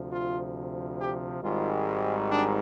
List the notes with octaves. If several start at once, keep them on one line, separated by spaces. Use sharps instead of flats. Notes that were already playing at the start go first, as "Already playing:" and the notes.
Already playing: D2 C3 F3
F4
G4
G#1 G#2 D#3 G3 F4
D4